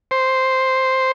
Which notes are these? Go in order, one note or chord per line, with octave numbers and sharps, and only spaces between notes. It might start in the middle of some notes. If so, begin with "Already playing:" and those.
C5